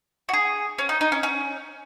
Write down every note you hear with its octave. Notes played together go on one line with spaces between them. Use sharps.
F#4
G#4
C#4
D#4
D#4
C#4
C#4